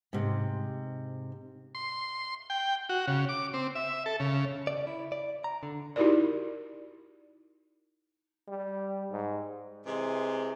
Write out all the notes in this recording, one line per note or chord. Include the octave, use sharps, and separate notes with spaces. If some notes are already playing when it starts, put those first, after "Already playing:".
G#2 C3
C6
G5
F#4
C#3
D6
C4
E5
A4
C#3
D5
E4
D5
A#5
D3
D#4 E4 F#4 G4 A#4 D5
G3
G#2
C3 E3 G#3